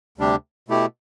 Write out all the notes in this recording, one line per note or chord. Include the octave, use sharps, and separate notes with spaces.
D2 C3 G3 D4 G4
B2 A3 E4 G4